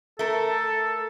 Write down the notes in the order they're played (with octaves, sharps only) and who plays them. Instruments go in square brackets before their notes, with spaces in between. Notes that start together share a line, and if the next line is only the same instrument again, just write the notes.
[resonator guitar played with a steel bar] A3 A#4 [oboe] A4